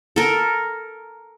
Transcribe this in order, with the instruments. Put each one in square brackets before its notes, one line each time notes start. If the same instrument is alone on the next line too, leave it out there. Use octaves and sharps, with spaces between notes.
[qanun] A4 A#4